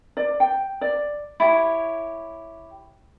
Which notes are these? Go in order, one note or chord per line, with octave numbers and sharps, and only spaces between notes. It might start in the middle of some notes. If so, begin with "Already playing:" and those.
D5
G5
D5
E4 G4 C#5